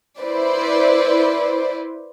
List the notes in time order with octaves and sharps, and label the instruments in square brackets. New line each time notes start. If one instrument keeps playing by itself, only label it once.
[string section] E4 B4 C5 D5